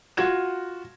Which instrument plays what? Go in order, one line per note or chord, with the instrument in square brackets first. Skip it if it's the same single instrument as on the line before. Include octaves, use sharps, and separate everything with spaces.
[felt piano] F4 F#4 G#6 E7